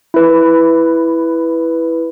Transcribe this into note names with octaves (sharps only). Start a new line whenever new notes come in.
E4 B4